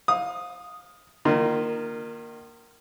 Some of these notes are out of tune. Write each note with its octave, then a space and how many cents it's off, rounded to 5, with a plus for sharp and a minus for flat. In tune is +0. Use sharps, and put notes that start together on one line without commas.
F5 +25 D#6 -5
D#3 -30 A#3 +0 F4 +0